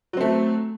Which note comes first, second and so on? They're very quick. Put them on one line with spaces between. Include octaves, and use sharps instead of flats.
F#3 C4 A3